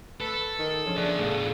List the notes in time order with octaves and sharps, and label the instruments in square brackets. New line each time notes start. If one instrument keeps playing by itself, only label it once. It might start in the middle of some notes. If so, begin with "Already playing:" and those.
[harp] A3 [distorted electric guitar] A4 [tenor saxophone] B4
[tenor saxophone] D#3
[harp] F3 D4 G#4 [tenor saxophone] C#4
[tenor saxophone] D4 [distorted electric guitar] G#4 E5 [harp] C#5 F5 C#6
[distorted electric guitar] A2 B3 [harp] G#4 A4 F5